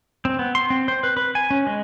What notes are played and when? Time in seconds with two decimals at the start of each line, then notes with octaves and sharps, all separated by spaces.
0.25 C4
0.39 B3
0.55 C6
0.70 C4
0.88 C5
1.03 B4
1.17 B4
1.35 G#5
1.51 C#4
1.67 G#3